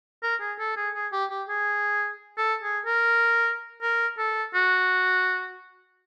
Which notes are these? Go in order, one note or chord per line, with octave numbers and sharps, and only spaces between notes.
A#4
G#4
A4
G#4
G#4
G4
G4
G#4
A4
G#4
A#4
A#4
A4
F#4